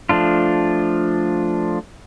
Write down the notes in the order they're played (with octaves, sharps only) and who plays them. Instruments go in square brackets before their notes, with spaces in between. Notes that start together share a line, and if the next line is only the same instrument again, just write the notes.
[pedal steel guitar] F3 A3 D4 F4